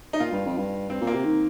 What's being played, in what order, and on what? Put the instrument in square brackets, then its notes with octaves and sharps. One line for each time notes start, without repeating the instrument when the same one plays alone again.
[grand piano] D#4
[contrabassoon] A#2 [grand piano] F4
[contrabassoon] G2
F2
G2
[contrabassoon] G2 [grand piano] C4
[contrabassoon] A#2
[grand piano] A#3
[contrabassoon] C3
D#3